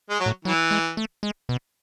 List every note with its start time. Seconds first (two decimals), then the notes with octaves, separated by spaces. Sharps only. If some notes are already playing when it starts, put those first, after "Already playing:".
0.10 G#3
0.20 F#3
0.26 A2
0.45 E3 F#3
0.71 G#3
0.97 A3
1.23 G#3
1.49 B2